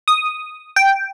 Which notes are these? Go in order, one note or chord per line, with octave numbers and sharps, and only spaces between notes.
D#6
G5